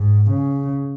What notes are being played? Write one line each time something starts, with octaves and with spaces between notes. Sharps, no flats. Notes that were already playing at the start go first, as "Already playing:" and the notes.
Already playing: G#2
C#3